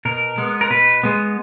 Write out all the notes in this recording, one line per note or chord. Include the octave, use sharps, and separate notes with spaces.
B2 A#4
G#3 B3
A#4
B2 B4
G#3 B3